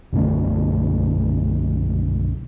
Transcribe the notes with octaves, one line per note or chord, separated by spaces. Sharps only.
B1 F#2 D3 A3